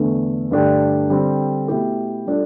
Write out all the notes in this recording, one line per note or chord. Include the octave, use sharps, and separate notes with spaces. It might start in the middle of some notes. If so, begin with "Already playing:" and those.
Already playing: E2 D3 A3
G2 D3 A3 D4 G4
D3 G3 C4
B2 A3 E4 G4
G3 D4 F4 A4